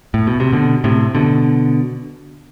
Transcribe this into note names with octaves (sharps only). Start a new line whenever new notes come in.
A2
B2
C3
B2 D3
A2 C3
B2 D3